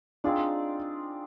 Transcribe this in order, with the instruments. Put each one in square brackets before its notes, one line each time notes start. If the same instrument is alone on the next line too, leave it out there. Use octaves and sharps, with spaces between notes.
[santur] C4 D#4 G#4 D5 [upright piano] D4 F4